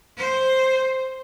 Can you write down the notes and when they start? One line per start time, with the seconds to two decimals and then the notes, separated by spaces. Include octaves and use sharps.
0.17 C5